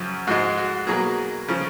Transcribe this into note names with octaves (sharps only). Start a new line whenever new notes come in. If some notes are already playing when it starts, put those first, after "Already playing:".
Already playing: F#2 C#3 F3
G#2 F3 G#3 F#4
F#4
B2 F#3 A#3 G#4
C#3 F3